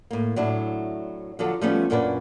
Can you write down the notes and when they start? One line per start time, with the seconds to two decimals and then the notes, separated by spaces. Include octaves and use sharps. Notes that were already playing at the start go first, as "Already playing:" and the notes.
0.11 A2 A#3
0.36 A2 F#3 D4 E4
1.39 D3 F3 F#3 A4
1.61 F3 G3 A3 B3 C#4 G4
1.90 F#2 A#2 A#3 C#4 D4 B4